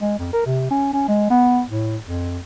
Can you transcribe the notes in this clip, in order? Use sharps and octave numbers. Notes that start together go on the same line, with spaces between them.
G#3
F2
A#4
C3
C#4
C#4
G#3
B3
A2
F2